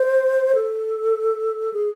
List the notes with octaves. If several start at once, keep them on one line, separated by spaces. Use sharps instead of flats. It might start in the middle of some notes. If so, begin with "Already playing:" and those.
Already playing: C5
A4
G#4